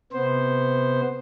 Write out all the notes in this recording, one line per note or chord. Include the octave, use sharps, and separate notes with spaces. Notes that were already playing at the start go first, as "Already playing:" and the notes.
C3 B3 C5